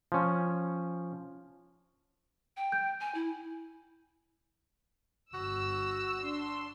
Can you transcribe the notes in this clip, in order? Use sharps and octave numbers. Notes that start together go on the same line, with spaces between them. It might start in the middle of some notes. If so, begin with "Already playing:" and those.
F3 C#4
G5
G6
G#5
E4
G1 F#4 E6
D4 C6